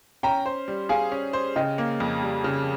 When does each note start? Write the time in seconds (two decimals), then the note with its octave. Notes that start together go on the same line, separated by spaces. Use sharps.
0.23 C#4 G5 A#5
0.46 C5
0.68 G3
0.89 G#4 F5 G#5
1.12 C#4
1.33 C5
1.56 C#3 D#5 G5
1.78 A#3
2.00 F2
2.22 G3
2.44 C#3